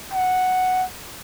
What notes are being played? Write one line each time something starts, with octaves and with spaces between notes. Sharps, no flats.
F#5